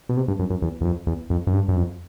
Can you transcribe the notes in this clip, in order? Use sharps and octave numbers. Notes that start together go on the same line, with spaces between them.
B2
C3
G2
F#2
F#2
E2
E2
F2
E2
F2
F#2
G2
F#2
F2